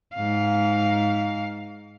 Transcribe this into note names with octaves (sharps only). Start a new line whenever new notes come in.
G#2 F5